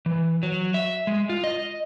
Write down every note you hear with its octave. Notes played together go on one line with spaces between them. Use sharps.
E3
F#3
E5
G#3
F4
D#5